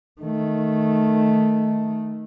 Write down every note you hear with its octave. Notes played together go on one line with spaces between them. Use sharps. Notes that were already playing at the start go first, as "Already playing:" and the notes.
D#3 A3